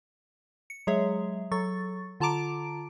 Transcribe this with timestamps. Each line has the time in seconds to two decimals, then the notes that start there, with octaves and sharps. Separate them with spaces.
0.70 C#7
0.87 F#3 G#3 G#4 C#5 E5
1.51 F#3 A4 C#6 A6
2.20 D3 F4 A5 A#5 D6 D7